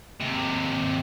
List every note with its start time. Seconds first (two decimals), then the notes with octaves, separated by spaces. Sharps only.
0.20 D#2 C3